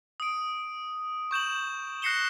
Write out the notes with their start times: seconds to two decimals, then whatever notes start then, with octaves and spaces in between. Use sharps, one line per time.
0.20 D#6 D7
1.31 C#6 G6 E7 F#7
2.02 F#6 A#6 C7 C#7 E7 G7